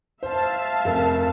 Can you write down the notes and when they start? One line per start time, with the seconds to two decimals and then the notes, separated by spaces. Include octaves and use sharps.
0.23 C5 E5 F5 A5
0.85 F1 A#4